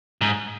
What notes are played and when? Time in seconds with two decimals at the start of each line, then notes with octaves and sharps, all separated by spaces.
0.21 G#2